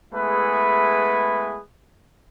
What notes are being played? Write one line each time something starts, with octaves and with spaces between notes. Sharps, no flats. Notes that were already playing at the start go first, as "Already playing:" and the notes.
G#3 A3 B3 E4 G#4 B4